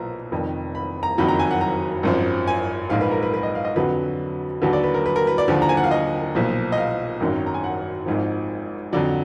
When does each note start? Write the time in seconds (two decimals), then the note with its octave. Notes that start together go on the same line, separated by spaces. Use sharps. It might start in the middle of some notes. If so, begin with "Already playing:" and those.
Already playing: B1 A#2 F3 B4 A#5
0.31 F1 F2 D#3
0.75 B5
1.03 A#5
1.18 F#1 F2 D#3 F#3 B5
1.28 A#5
1.39 G#5
1.51 F#5
1.61 A#5
2.03 G#1 F#2 F3
2.47 G#5
2.89 A#1 G#2 F3 F5
3.01 B4
3.11 A#4
3.23 B4
3.34 B4
3.43 D#5
3.55 F5
3.65 D#5
3.76 F2 D3 F#3 B4
4.62 D#2 D3 F#3 B4
4.73 D5
4.84 B4
4.94 A#4
5.06 B4
5.16 A#4
5.27 B4
5.38 D5
5.48 D#2 D3 F3
5.62 A#5
5.69 G#5
5.77 F#5
5.84 F5
5.91 D#5
6.35 B1 A#2 F3
6.72 D#5
6.78 F5
7.20 G#1 F#2 D#3 F#3
7.46 A#5
7.54 G#5
7.64 F#5
8.06 G#1 G#2 F3
8.93 F2 D3 F#3 D5